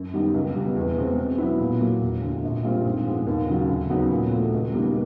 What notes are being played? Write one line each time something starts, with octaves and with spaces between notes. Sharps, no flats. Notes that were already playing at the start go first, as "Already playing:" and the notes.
Already playing: F#2
D#3 G3 B3 D#4
C#2
B2 G3
E2
B2 G#3 C4
B2
F#3 B3 E4
A#2
F#3 A#3
E1
D2 D3
A#1
A#2 G3 C4 F4
G#2
F3 G#3 B3
D#2
C#3 F#3
D2
C#3 F#3 B3 D#4
A#2
F3 A3
C#2
B2 G3 A#3 D#4